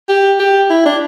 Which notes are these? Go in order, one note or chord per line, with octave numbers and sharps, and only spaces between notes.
G4
G4
E4
D4